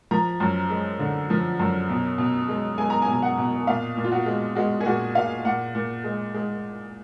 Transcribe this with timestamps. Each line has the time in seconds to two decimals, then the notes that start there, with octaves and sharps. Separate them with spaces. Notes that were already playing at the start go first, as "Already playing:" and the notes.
0.11 F3 A#5
0.40 F#2
0.70 G#3
0.99 D3
1.30 F3
1.60 F#2
1.89 B2
2.18 B2
2.48 G#3
2.78 G#3 G#5
2.90 A#5
3.02 G#5
3.07 B2
3.13 G#5
3.22 F#5
3.38 B2
3.67 A#2 F5
3.97 A#2
4.04 F4
4.12 F#4
4.26 G#3
4.55 G#3 F#4
4.81 G#4
4.86 A#2 F#4
5.15 A#2 F5
5.45 A#2 F#5
5.75 A#2
6.04 G#3
6.34 G#3